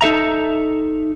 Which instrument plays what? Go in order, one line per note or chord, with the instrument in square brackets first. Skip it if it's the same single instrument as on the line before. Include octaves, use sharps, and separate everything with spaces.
[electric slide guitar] D#4 A4 E5 A#5